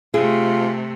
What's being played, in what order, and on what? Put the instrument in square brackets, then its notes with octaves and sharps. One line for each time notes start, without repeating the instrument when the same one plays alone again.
[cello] C3 A3 [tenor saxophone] F4 [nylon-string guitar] G#4